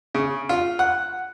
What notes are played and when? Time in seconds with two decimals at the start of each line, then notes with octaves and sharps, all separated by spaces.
0.15 C#3
0.49 F4
0.79 F#5